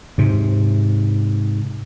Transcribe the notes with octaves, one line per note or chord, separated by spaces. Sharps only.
G#2 C3